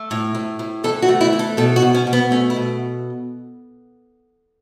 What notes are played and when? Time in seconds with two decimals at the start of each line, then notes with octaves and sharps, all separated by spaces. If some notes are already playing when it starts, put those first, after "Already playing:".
Already playing: A3
0.11 A2
0.35 A2
0.59 A2
0.84 E3 A4
1.02 F#4
1.09 A3
1.21 E4
1.33 E3
1.39 A4
1.57 B2 A4
1.76 F#4
1.82 B2
1.94 C#4
2.07 B2
2.13 B3
2.31 A3 C#4
2.50 E4
2.56 B2